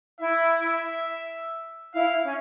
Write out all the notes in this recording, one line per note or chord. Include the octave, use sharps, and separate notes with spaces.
E4 E5
E5
E4 F5
C#4